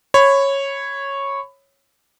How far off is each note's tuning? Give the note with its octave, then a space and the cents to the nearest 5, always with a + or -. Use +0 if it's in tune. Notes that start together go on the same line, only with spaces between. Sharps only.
C#5 -10 B5 +20